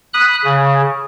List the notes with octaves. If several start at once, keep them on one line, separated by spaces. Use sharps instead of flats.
B5 D#6 F#6
C#3